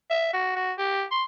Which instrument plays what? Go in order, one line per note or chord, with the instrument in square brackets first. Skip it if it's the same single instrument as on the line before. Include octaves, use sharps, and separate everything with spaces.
[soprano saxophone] E5
F#4
F#4
G4
C6